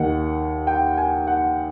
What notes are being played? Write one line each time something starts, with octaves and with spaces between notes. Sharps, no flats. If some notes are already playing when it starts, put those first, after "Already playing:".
Already playing: D#2 D#3 F#5
G5
G#5
F#5